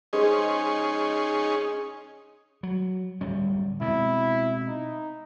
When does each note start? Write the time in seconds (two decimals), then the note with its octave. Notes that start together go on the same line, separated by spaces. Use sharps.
0.13 G#3 C#4 D#4 G#4 C5
2.63 F#3
3.21 D1 G3 C#4
3.81 B2 G#3 C4 E4
4.66 D#4